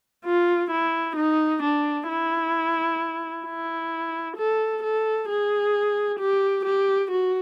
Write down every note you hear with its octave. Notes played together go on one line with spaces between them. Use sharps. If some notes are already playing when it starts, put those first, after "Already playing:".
F4
E4
D#4
D4
E4
E4
A4
A4
G#4
G4
G4
F#4